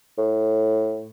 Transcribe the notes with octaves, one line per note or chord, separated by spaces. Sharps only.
A2